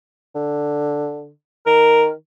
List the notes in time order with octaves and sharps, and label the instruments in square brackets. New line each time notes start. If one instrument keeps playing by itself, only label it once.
[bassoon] D3
[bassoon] D#3 [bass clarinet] A#4